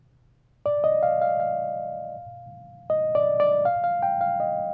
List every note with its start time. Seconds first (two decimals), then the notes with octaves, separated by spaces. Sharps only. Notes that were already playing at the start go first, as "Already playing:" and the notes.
0.66 D5
0.84 D#5
1.03 F5
1.22 F5
1.40 F5
2.90 D#5
3.15 D5
3.40 D5
3.65 F5
3.84 F5
4.03 G5
4.21 F5
4.40 D#5